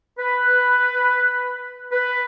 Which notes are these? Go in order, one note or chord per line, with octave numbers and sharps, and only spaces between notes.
B4
B4